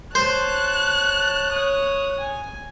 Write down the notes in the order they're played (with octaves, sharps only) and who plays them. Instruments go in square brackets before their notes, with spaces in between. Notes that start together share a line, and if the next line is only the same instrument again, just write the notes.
[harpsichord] C5 [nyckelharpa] C#5 A5 [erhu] F#6
[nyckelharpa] C#5 D#6
G#5